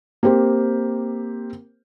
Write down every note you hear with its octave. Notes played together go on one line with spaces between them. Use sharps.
A#3 C4 G4 C5